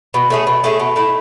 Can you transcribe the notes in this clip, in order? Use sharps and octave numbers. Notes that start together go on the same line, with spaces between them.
B2
A3 C#4 G#4
B2
A3 C#4 G#4
B2
A3 E4